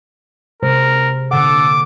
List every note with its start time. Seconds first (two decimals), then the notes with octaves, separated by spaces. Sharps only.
0.63 C3 G#3 A#4 C5
1.31 A#2 D3 A4 F#5 D6